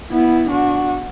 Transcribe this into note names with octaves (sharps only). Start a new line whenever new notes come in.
B3 E4
D4 F#4